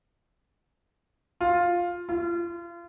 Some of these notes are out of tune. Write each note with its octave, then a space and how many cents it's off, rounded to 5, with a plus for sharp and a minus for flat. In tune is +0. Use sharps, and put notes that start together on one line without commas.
F4 +5
F4 -35